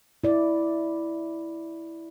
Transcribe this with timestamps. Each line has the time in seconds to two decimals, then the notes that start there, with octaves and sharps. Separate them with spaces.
0.24 E4 D5